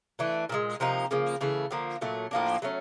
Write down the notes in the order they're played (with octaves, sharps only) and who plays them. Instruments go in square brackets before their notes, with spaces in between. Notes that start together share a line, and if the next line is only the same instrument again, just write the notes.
[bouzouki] E3 A3 D4
A#2 F3 G#3
C3 F3 A#3 D#4
C#3 F3 A#3
C#3 E3 A3
D3 F3 A#3
A#2 F#3 A3
A2 F3 A#3 D4
F#3 A3 C#4